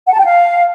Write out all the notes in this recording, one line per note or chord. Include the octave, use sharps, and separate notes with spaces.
F#5
A5
G5
F5